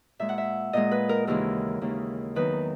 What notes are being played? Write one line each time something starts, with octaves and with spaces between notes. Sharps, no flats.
A#2 G#3 E5
F#5
E5
A#2 G#3 D#5
B4
A#4
D#2 C#3 E3 G#3 A#4
D#2 C#3 E3 G#3
E2 D#3 F#3 B4